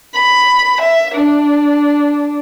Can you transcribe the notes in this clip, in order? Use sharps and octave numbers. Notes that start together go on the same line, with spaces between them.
B5
E5
D4